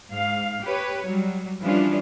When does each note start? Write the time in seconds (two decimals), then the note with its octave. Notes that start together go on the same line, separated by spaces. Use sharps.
0.10 G#2 F5
0.65 G4 B4 C#5
1.07 F#3 G3
1.62 E3 F3 G3 C#4 D4 F4